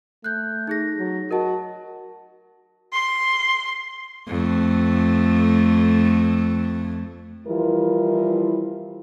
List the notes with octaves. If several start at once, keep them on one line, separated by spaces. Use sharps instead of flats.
A3 F#6 G6
D#4 G#4 A#6
F#3
F#4 A#4 D#5 A5
C6
F2 A3
E3 F3 G3 E4 F4 A#4